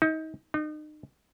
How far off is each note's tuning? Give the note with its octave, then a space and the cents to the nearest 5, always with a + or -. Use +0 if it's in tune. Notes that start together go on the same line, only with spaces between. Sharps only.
D#4 +30
D#4 -35